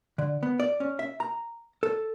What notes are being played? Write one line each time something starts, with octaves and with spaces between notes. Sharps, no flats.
D3
B3
D5
C#4
E5
A#5
A4